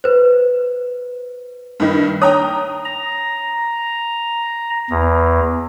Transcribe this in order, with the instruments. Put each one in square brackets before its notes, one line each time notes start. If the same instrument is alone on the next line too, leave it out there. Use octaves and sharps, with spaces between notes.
[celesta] B4 C5
[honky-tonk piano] G2 D#3
[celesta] C#5 [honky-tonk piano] G5 A#5 D#6
[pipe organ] A#5
E2